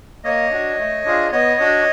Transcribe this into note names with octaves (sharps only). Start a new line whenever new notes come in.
A#3 C#5 D#5
D4 F#4
A3
D4 F4 G#4
B3 C#5 D#5
D4 F#4